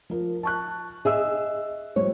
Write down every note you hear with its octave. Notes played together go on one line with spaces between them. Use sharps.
F3 A#4
A5 C#6 F#6
G#4 D#5 E5 E6
F3 G3 C5 C#5